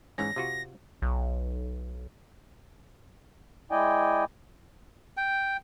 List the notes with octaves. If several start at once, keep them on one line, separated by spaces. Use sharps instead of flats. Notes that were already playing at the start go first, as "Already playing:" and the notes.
G#2 E3 C#4 A#6
C3 F4 F#4
B1
G#3 E4 D5 D#5 G5 G#5
G5